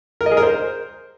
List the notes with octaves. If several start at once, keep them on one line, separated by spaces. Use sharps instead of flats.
A#4
D#5
G#4
A#4
C5